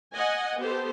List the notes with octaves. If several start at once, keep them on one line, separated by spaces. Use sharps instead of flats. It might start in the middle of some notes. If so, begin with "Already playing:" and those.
D#5 F#5 G#5
B3 G4 A4 C5